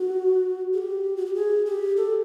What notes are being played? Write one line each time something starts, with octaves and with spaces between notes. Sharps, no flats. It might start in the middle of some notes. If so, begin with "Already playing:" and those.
Already playing: F#4
G#4
G4
F#4
G4
G#4
G4
A4